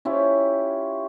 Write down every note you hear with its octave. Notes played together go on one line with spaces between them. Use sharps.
C#4 E4 F4 G4